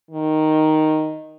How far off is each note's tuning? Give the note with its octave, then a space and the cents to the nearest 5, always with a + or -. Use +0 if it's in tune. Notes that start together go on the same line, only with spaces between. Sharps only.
D#3 +0